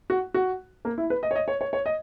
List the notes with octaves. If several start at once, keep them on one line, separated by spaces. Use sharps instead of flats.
F#4
F#4
A#3
E4
B4
D#5
C#5
D#5
C#5
C#5
C#5
D#5